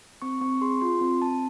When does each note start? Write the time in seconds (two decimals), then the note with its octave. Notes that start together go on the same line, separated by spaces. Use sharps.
0.22 C4 C#6
0.41 C4 C#6
0.61 G#4 C6
0.81 F4 C6
1.01 C4
1.21 C4 A5